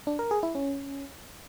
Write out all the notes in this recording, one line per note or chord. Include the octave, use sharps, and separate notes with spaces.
D4
A#4
G#4
E4
C#4